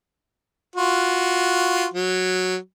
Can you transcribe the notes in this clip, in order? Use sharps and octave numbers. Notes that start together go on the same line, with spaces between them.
F4 F#4
F#3